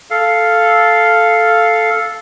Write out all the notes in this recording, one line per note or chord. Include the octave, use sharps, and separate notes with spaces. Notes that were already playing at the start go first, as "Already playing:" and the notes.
A4 F5